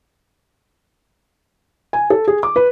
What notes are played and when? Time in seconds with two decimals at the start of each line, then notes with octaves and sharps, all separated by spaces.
1.93 G#5
2.10 A4
2.28 G#4
2.43 D6
2.56 B4